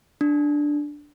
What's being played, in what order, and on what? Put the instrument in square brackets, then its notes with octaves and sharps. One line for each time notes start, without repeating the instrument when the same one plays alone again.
[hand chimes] D4